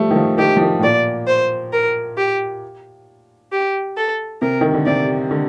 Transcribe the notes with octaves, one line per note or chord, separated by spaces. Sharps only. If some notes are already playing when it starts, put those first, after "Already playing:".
Already playing: F3 G3 A3
D#3
F3
D#3 G4
F3
D#3
A2
A#2 D5
C5
A#4
G4
G4
A4
C3 A#4
D#3
D3
C3 D5
D3